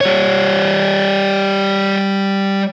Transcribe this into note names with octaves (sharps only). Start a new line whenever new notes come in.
G3 C#5